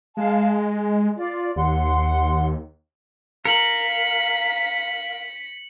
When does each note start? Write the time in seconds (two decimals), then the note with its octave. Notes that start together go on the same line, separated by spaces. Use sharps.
0.17 G#3 F5 A5
0.54 D#5
1.17 F4 D5
1.56 D#2 F#5 C6
3.45 A#4 F5 B6 C#7 F#7